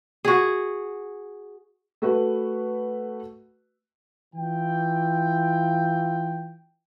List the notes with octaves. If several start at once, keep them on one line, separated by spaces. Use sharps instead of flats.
F#4 G#4
A3 F#4 B4
E3 F4 G5